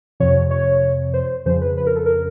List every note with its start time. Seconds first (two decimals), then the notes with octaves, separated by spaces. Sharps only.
0.20 F2 C3 F3 C#5
0.51 C#5
1.14 C5
1.45 F2 C#3 F3 C5
1.61 B4
1.77 B4
1.87 A#4
1.96 A4
2.06 A#4